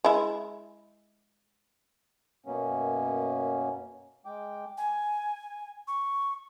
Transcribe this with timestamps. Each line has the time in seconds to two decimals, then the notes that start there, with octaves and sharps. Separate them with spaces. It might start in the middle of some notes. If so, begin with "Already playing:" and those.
0.04 G#3 E4
2.46 F#2 B2 F#3 A#3 B3 C#4
4.26 G#3 G5 D6
4.78 G#5
5.88 C#6